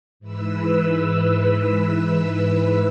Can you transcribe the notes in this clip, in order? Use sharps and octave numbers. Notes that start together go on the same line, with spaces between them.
G#2 E3 B4 E6